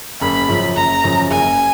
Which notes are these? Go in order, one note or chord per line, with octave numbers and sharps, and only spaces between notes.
F#1 B5
F#2 C#3 F3
F#1 A#5
F#2 C#3 F3
F#1 G#5